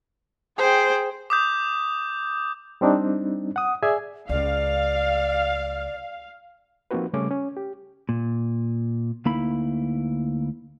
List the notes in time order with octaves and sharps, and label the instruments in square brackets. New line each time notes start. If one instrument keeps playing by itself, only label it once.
[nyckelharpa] G#4 G5 [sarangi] C5
[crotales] D6 D#6 G6
[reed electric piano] G3 C4 D4 D#4
F#5 D#6
G#4 D5 E5 G#5
[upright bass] C#2 [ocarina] D5 [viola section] F5
[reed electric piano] F3 A#3 C4 D#4 F#4 B4
C#3 G3 A3 C#4 D6
C#4
G4
[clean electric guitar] A#2
D2 A#3 D#4 E4 B5